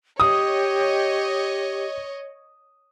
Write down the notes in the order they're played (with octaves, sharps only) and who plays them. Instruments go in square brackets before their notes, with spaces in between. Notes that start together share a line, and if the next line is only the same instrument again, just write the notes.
[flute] G4 [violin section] C#5 D#5 [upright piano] D#6